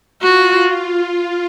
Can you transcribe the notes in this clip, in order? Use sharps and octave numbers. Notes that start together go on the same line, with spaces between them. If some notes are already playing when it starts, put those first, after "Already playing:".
F4 F#4